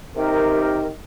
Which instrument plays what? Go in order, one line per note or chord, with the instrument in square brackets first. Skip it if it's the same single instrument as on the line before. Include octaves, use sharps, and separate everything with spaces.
[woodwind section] C3 D#3 D#4 G4 A#4